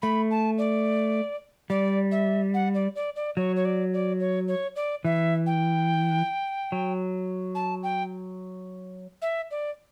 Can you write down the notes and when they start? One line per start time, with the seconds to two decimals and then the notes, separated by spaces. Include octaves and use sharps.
0.02 A3 B5
0.31 A5
0.58 D5
1.70 G3 D5
2.12 E5
2.54 F#5
2.74 D5
2.95 D5
3.16 D5
3.37 F#3 C#5
3.56 C#5
3.65 D5
3.93 D5
4.20 C#5
4.48 C#5
4.76 D5
5.05 E3 E5
5.46 G5
6.72 F#3
7.55 A5
7.83 G5
9.22 E5
9.51 D5